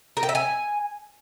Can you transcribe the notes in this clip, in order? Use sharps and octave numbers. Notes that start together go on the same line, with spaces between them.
A#4
G5
E5
G#5